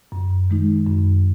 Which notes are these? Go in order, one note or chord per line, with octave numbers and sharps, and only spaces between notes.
F#2
D#3 G#3 D#4
F#2